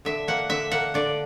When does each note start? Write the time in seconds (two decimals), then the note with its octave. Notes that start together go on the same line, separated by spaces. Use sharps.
0.05 D3 E5
0.28 A#3 F#5
0.49 D3 E5
0.72 A#3 F#5
0.94 D3 D5